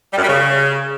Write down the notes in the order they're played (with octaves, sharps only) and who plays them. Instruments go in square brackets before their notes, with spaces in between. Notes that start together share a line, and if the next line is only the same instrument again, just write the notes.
[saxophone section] G3
F#2
G3
C#3